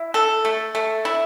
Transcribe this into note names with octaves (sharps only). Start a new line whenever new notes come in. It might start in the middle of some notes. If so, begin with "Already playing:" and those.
Already playing: E4
A4
A3
A3
E4